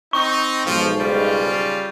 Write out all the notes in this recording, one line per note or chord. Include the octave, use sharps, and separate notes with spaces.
C4 D#4 C#6
B1 G#2 F3
C#3 G3 F4